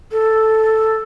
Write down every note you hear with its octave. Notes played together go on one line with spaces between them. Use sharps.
A4